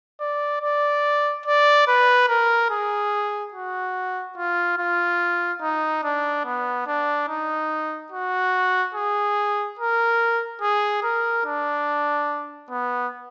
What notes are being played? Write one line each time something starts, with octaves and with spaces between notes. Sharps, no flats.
D5
D5
D5
B4
A#4
G#4
F#4
F4
F4
D#4
D4
B3
D4
D#4
F#4
G#4
A#4
G#4
A#4
D4
B3